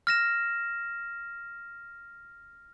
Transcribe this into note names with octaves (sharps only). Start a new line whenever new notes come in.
F6 A#6 E7